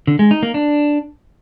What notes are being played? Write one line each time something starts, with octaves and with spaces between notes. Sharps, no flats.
D3
G#3
D#4
A#3
D4